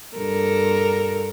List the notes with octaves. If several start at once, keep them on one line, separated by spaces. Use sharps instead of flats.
G2 A4 A#4